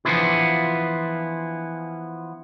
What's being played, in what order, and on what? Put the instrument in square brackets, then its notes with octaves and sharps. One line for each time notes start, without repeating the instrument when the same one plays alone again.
[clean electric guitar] E3 F3 B3 D4 E4 F4